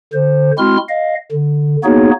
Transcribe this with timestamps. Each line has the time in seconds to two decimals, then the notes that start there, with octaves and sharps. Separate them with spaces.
0.13 D3 C5
0.58 G#3 C4 E4 F#4 C6 F6
0.89 D#5 F5
1.32 D3
1.84 A#3 B3 D#4 F#4 G#4 C#5